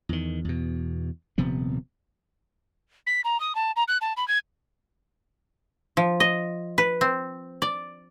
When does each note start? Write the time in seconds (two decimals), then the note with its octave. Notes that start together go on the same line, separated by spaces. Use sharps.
0.09 E2 D#3
0.45 E2 B2
1.38 D#1 C3 F3 B3
3.07 B6
3.24 A#5
3.40 D#6
3.55 A5
3.76 A#5
3.88 F#6
4.01 A5
4.17 B5
4.28 G#6
5.97 F3
6.20 D#5
6.78 B4
7.01 C4
7.62 D5